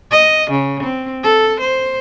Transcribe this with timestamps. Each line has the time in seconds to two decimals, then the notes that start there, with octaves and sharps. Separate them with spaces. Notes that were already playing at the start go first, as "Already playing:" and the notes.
0.11 D#5
0.51 C#3
0.83 C4
1.23 A4
1.60 C5